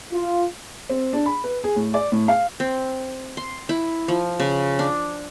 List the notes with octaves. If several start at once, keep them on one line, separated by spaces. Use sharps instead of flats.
F4
C4
D4
B5
B4
G#4
A2
D5
A2
F5
C4
C6
E4
F3
C#3
D4